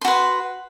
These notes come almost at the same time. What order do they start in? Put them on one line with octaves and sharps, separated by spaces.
C6 F#4 B4